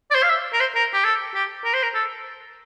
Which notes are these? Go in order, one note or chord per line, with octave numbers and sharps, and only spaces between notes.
D5
C5
F5
E5
A#4
C5
A#4
G4
A4
G4
A#4
C5
A#4
A4